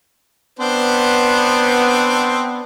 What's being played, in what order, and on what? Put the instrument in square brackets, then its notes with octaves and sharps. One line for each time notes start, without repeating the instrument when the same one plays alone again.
[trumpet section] B3 [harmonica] C4 D4 C5